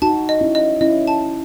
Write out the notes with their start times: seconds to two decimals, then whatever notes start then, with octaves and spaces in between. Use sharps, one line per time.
0.02 D#4 F#4 A5
0.29 D#5
0.41 C#4 E4
0.55 D#5
0.81 C#4 E4 D#5
1.07 A5